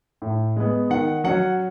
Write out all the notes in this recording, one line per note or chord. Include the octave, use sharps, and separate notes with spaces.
A2
G#3 B3
D#3 F#5
F#3 C#4 F#5